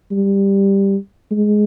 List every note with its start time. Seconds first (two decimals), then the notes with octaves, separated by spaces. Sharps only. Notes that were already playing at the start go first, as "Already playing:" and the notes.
0.11 G3
1.31 G#3